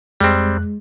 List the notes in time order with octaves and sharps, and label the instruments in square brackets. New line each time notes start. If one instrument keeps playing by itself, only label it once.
[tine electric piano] F2 F#6 [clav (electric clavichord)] G3 C4 [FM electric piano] G#3